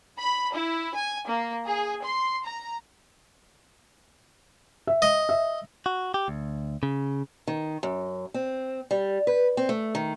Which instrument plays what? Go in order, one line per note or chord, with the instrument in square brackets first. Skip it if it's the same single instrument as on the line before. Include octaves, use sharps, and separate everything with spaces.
[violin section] B5
E4
G#5
A#3
G#4
C6
A#5
[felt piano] E5
[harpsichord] D#5
[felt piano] E5
[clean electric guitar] F#4
G4
D2
C#3
[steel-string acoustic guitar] D#3
F#2
C4
G3
B4
C4
A3
D#3